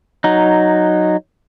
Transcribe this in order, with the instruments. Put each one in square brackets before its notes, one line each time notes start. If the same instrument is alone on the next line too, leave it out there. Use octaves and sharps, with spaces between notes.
[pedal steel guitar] F#3 D#4